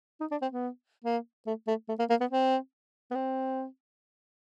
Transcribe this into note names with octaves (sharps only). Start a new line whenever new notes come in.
D#4
D4
C4
B3
A#3
A3
A3
A3
A#3
A#3
B3
C4
B3
C4